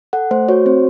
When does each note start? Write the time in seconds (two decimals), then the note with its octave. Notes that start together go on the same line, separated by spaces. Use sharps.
0.13 A4 F#5
0.31 A3 C5
0.48 F#4 C#5
0.66 C4 C5